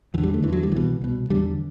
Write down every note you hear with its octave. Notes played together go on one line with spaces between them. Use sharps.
E2 D3 E3
G3
A3
E2 D3 E3
F#3
G3
C2 B2 E3
C2 B2
E2 D3 G3